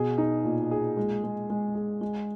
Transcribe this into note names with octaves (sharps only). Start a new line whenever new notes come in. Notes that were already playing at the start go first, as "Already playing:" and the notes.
Already playing: B2 G#4
D#4
A#2
G#4
G#3
G#3
G#3
G#4
G#3